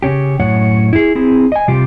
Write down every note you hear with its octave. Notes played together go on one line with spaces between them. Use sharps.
C#3 C#4 G4
F#2 A2 C#5 F#5
E4 G#4
C4 E4 G#4
D#5 G#5
C3 G3 F4 G4